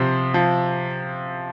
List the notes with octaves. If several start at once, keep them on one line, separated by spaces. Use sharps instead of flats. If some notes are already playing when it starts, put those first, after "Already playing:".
Already playing: C3 F3 C5
F3